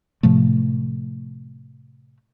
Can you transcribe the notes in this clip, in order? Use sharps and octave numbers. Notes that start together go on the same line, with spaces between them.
A2 C3 F3 A3